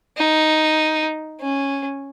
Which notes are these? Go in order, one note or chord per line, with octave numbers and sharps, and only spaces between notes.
D#4
C#4